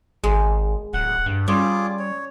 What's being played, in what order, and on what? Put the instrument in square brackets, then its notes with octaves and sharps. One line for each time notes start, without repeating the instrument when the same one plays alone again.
[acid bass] G#1 [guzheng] G#3
[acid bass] D1 [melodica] F#5
[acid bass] G2
[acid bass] G3 [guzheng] C#4 [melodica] F4 G#4 D6
[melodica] C#5